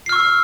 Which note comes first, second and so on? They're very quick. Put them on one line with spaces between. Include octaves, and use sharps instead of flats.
C7 F6 C#6 E6